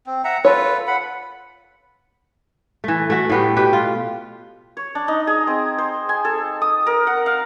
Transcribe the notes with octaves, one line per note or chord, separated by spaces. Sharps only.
C4
E5 F#5 A#5
F4 A4 B4 C#5
F#5 B5
E3 A3
A3 F#4
A2 B3 G4
B2 G4 B4
F4
C#5
D4
D#4
G#4
C4
C5
G#5
A4
D#6
A#4
F#5
F5